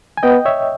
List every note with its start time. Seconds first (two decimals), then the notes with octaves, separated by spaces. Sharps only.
0.17 G#5
0.23 B3 D#5 G5
0.45 C#5 E5